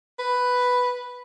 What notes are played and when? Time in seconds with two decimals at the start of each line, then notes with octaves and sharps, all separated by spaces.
0.19 B4